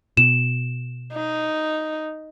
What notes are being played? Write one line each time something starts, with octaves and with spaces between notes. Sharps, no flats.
B2 E7
D#4